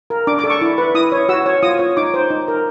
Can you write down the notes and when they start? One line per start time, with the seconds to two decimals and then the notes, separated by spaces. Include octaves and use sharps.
0.10 A#4
0.27 D4 D6
0.39 D6
0.44 A4
0.50 C#6
0.61 E4
0.78 B4
0.94 E4 D#6
1.12 C#5
1.29 F#4 E6
1.46 C#5
1.63 F4 D#6
1.79 C#5
1.97 D#4 D6
2.14 C5
2.30 D#4
2.48 A#4